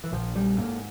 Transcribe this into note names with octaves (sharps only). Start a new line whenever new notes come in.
E3
A#1 F3
G3
G#2 A#3